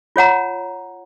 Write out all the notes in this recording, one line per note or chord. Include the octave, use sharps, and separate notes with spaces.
F4 C#5 F#5 A#5